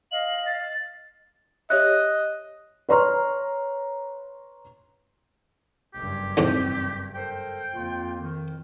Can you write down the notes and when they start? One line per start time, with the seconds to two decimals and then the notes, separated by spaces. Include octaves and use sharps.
0.12 D#5 F5 F#7
0.46 A6
1.70 G4 C#5 D#5 E5 F#6
2.89 B4 C#5 A#5 C6 C#6 F6
5.94 F#1 G2 G4
6.37 B1 E2 G#2 C4
7.15 A4 A#4 C5 G5
7.73 F2 A#3 F4
8.20 D#3